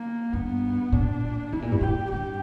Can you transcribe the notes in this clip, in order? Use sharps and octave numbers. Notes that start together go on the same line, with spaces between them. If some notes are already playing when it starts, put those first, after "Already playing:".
Already playing: A#3
G2 B3
A#2 D4
B2 E4
A#2
G2
A#2 G4
G2 G4